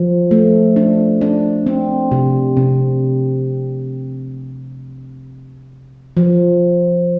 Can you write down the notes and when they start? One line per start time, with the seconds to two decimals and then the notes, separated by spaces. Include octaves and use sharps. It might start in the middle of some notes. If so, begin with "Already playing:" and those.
Already playing: F3
0.31 A3
0.76 D4
1.21 D4
1.66 C4
2.12 C3
2.57 C3
6.17 F3